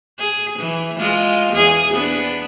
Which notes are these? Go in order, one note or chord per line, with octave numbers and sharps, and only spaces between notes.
G#4
E3
G#3 F4
E2 G#4
B3 D4